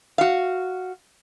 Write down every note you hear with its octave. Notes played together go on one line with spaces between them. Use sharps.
F#4 F5